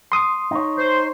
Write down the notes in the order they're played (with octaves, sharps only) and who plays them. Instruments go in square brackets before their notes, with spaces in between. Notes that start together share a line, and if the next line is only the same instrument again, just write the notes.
[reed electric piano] C6 D#6
[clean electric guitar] D#4 C#5
[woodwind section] C5